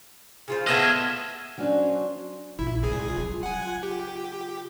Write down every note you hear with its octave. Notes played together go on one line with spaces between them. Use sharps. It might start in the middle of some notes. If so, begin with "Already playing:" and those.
C#3 F4 C5
A3 B3 D#4 D#5 E5 F6 G#6
F#3 C#4 D4 C5
A#1 G2 E4 F4
C2 G#3 G#4
C#3 F#3
F#5 G#5
G4